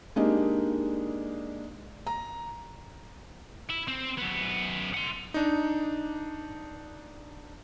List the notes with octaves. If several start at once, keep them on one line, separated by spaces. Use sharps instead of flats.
G#3 A#3 D4 D#4 G4
A#5
E4
C4
F#2 B3
F#5 C6
D4 D#4